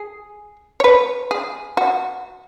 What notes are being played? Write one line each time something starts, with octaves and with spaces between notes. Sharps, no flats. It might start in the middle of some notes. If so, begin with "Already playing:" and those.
Already playing: G#4
C#5
B4
G#4
F#4